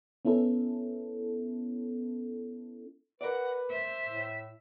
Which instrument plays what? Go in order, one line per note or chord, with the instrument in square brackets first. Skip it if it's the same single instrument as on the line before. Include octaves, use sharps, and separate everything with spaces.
[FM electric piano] B3 C#4 E4 A4
[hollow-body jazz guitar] A#4 D5 [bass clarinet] B4 [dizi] F#5
[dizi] C5 [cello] E5
[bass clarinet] A2